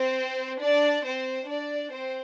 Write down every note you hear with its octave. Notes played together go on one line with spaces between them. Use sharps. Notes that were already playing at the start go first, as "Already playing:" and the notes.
Already playing: C4 C5
D4 D5
C4 C5
D4 D5
C4 C5